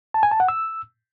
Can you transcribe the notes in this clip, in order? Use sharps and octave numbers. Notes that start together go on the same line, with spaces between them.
A5
G#5
A5
F#5
E6